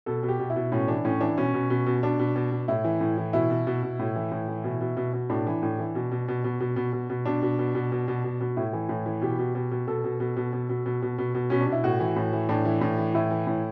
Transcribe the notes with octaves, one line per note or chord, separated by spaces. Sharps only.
B2 A4
B2
G4
B2
E4
B2
A2 C#4
E3 D4
A2 C#4
E3 D4
B2 C#4
B2
B2
B2
B2 D4
B2
B2
B2
A2 E4
E3
A2
E3
B2 E4
B2
B2
B2
A2
E3
A2
E3
B2
B2
B2
B2
A2 D4
E3
A2
E3
B2
B2
B2
B2
B2
B2
B2
B2
B2 D4
B2
B2
B2
B2
B2
B2
B2
A2 E4
E3
A2
E3
B2 G4
B2
B2
B2
B2 A4
B2
B2
B2
B2
B2
B2
B2
B2
B2
B2 C#4
D4
B2
E4
A2 F#4
E3
A2
E3
A2 D4
E3
A2
E3
A2 E4
E3
A2